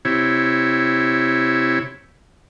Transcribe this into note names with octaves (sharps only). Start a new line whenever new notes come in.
C3 E4 C#5